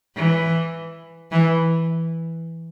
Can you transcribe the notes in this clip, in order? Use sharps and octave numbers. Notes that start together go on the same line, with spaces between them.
E3
E3